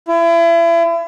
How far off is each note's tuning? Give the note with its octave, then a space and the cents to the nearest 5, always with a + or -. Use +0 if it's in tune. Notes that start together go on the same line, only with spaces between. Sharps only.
E4 +35